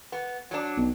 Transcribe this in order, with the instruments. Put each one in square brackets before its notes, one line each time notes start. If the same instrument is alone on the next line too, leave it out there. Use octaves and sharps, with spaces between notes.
[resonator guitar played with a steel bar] B3
F#3 D4
[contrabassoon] B1